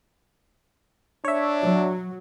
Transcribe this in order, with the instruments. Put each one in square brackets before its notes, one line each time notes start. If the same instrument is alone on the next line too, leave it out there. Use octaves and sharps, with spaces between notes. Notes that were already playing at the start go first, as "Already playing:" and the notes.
[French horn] D4 [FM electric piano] C#5 E5
[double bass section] F#3